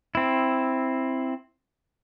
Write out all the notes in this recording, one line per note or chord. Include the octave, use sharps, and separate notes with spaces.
C4 E4